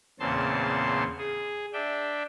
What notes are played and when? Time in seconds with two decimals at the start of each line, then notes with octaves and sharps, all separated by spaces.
0.20 E2 A#2 C#3 C4 A5 C6
1.18 G#4
1.73 D4 E5 G5